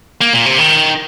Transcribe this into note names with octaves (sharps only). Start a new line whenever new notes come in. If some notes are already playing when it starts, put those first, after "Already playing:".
A#3
A#2
C3
D#3